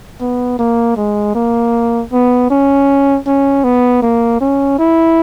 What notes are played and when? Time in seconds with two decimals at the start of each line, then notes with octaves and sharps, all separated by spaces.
0.21 B3
0.59 A#3
0.97 G#3
1.35 A#3
2.12 B3
2.50 C#4
3.27 C#4
3.64 B3
4.02 A#3
4.41 C#4
4.79 E4